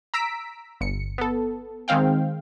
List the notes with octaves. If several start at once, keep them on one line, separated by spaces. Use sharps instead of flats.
A#5 E6 B6 D7
G1 C#7
B3 A4
D#3 G#3 C4 F5 G5